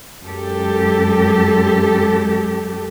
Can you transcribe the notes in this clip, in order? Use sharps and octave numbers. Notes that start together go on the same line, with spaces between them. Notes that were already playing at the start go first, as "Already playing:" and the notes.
F#2 G#3 G4 A4